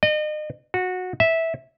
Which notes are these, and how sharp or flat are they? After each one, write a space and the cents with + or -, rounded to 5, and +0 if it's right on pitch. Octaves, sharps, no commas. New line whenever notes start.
D#5 -35
F#4 -15
E5 -10